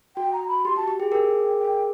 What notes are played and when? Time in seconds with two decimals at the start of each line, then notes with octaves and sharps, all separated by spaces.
0.16 F#4 G5
0.33 A#5
0.48 B5
0.65 G4 C6
0.76 F#4 A5
0.88 G4
1.00 G#4 G5
1.12 G#4 A#4
1.59 G5